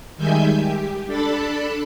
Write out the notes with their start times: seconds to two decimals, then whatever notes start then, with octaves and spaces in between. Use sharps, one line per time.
0.18 D#3 G3 G#3 E5 G#5 G6
0.58 G4
1.07 D4 A4 A5 B5